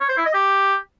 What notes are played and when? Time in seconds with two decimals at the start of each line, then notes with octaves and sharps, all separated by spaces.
0.01 C#5
0.09 C5
0.18 E4
0.26 D#5
0.34 G4